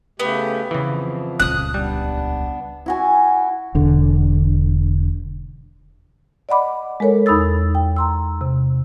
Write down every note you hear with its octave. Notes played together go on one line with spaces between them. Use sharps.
C#3 A3 B3 G4
F2 C#3 E3 F3
D#1 C#2 D#6 F#6
G3 B3 D4
E4 F#4 G#5
E1 D3
D5 D#5 F#5 B5 D6
G#3 A4 A#4 C#5
E2 D#4 B5 D#6 E6 A6
G5
A#5 C6 E6
C3